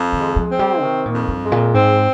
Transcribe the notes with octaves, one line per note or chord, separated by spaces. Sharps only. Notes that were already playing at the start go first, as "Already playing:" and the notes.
Already playing: F2
D#3
G#3
F3
C4
G3
C3 D#3
A#2
F2
G2
G#3
A#2
G#2 C4